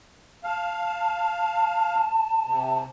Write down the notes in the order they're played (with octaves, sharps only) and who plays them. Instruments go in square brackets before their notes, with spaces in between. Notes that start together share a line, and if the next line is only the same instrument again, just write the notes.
[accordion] F5 [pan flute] A5
[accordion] C3